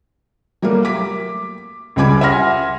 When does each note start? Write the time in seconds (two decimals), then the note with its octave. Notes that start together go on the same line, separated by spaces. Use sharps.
0.62 F#3 G3 A3 A#3
0.85 D6 B6
1.96 C#2 C#3 G3 B5 D6 G#6
2.21 E5 F#5 G#5 C6 F6 A#6